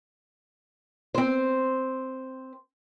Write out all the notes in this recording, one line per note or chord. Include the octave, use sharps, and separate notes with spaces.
C4 C5